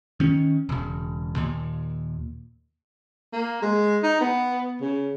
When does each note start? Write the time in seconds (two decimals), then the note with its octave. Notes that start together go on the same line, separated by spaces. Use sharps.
0.20 D#3 C#4
0.69 E1 C#3
1.36 D#2 A#2
3.33 A#3
3.62 G#3
4.03 D#4
4.21 B3
4.81 C#3